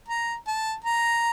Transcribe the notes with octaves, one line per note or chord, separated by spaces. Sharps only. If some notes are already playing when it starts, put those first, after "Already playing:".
A#5
A5
A#5